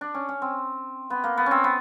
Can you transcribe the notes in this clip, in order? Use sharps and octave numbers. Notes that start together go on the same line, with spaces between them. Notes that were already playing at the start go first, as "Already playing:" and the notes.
D4
C#4
C#4
C4
B3
A#3
B3
C4 C#4
B3